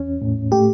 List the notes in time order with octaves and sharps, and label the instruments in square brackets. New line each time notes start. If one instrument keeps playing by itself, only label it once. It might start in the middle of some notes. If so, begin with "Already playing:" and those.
Already playing: [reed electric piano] E2 C#4
A2
[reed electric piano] A3 [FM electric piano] G4